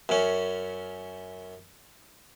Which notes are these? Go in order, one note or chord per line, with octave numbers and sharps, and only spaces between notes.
F#2 C#4